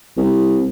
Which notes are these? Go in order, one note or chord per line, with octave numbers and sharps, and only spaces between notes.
C2